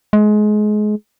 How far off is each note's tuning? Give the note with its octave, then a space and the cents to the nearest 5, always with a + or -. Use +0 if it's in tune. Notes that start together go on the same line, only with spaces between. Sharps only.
G#3 +25